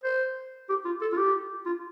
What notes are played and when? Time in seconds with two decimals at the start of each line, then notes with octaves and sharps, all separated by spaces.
0.04 C5
0.69 G4
0.85 F4
1.01 A4
1.12 F4
1.18 G4
1.66 F4